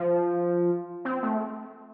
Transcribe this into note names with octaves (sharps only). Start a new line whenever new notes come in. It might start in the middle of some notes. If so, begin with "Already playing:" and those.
Already playing: F3
C4
A3